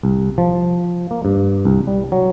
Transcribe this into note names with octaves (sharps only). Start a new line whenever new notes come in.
C2
F3
A#3
G2
C2
G3
F#3